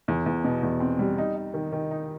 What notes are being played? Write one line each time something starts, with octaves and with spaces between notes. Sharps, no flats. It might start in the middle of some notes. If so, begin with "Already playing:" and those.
E2
E2
B2
E2
C4
G3
D#4
D#4
D#3
D#3
D#4